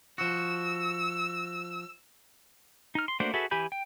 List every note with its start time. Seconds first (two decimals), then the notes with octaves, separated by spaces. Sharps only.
0.18 F3 F#4 E6
2.95 D#4 F6
3.08 C6
3.20 A3 A#3 D4 F#4 C5
3.34 F#4 G#4 A4 B4 E5
3.51 E3 G4 G#5 B5 G6
3.72 G5